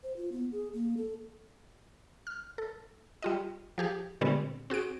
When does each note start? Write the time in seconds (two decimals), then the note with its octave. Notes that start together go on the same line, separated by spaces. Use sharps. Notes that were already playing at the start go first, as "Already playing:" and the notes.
0.03 C5
0.17 F4
0.32 B3
0.52 G#4
0.73 A#3
0.97 A4
2.27 F6
2.58 A4
3.22 G3 F4 D#5
3.78 F3 G4 G#4
4.21 A#2 D3 G3 G#3 B3 C4
4.70 C4 F#4 G#4 D7